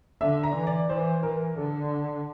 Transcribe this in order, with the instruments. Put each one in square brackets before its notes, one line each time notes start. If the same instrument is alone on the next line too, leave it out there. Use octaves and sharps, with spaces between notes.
[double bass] D3 [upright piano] E5
[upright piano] A#5
[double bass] E3
[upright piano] D5
[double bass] E3 [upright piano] C5
[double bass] E3 [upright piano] A#4
[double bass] D3 [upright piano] A4